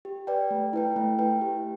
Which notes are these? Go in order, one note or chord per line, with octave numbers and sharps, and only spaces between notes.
G4
B4 D5 G5
A3
E4 B4 G5
A3
E4 B4 G5
G4